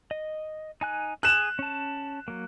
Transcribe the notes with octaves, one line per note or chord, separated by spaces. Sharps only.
D#5
D#4 G#5 F#6
G#4 F#6 E7
C#4 A5
F#3 A#3